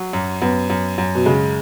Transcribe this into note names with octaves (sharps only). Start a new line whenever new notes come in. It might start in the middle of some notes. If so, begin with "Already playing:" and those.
Already playing: F#3
F#2
F#2 B3
F#2
F#2
B2
C#3 G#3